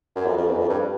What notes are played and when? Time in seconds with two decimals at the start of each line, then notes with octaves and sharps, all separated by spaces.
0.16 F#2
0.27 F2
0.37 F2
0.48 E2
0.58 F2
0.70 G2